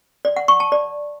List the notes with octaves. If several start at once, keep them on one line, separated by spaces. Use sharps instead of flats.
D5
F#5
C#6
A5
D5